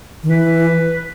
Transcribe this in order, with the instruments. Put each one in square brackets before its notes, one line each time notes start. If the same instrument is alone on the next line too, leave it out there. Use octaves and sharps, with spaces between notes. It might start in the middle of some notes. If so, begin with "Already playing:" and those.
[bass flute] D#3
[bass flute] E3 [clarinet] B4